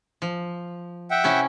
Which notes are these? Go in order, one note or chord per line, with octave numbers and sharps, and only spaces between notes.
F3
E5 F#5 G5
C3 C#4 E4